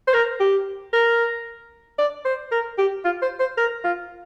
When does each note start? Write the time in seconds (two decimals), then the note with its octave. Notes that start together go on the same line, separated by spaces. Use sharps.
0.07 C5
0.14 A#4
0.40 G4
0.93 A#4
1.98 D5
2.25 C5
2.51 A#4
2.78 G4
3.04 F4
3.22 C5
3.40 C5
3.57 A#4
3.84 F4